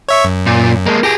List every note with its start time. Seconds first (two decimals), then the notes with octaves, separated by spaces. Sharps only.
0.09 C#5 E5 C#6
0.24 F#2
0.47 A#2
0.86 G#3 A#3
1.03 G4 G#4 A#6